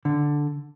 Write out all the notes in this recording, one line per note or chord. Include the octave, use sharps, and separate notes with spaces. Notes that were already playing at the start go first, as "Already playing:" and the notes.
D3